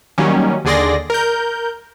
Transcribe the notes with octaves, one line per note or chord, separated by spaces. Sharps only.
D#3 F#3 G3 A#3 C#4
D#2 D3 G#4 D5 C6 A#6
A#4 G6